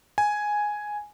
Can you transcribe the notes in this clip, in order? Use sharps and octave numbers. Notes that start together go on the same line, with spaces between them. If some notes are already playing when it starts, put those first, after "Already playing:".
G#5